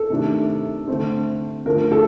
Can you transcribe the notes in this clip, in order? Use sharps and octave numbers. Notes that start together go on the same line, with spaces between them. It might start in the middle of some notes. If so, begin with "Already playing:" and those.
Already playing: A4
C3 D#3 A3 D4
D3 A3 C4
D3 F3 A3 A#4
A4